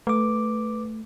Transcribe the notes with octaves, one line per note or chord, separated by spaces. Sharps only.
A3 B4 D6